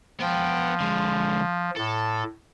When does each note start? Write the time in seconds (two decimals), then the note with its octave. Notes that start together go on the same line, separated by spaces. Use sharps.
0.21 F3 B3 G5
0.80 D3 G#3
1.77 A2 A4